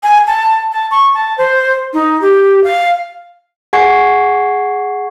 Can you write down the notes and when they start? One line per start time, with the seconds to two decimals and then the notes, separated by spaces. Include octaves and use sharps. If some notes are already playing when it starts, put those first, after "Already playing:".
0.03 G#5
0.27 A5
0.72 A5
0.91 C#6
1.14 A5
1.38 C5
1.93 D#4
2.21 G4
2.64 F5
3.73 G#4 F#5 G#5 C#6 G#6 C7